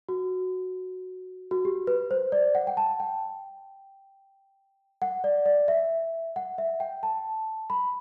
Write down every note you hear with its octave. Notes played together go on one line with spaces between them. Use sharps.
F#4
F#4
G4
B4
C5
D5
F#5
G5
A5
G5
F#5
D5
D5
E5
F#5
E5
G5
A5
B5